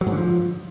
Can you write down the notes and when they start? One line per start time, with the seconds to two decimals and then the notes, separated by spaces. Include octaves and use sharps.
0.01 F#3
0.07 G#2
0.12 D3
0.18 F3